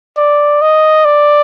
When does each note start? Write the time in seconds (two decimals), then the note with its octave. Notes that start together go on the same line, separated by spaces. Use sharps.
0.17 D5
0.61 D#5
1.05 D5